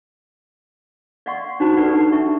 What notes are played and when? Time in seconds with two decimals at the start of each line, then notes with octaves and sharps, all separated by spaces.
1.26 D5 D#5 F5 F#5 C6 C#6
1.60 D4 D#4 F#4 C5 A5 B5
1.77 G4 A4 B4 D5 F#5
1.91 D4 D#4 F#5 A5
2.12 D4 E5 C#6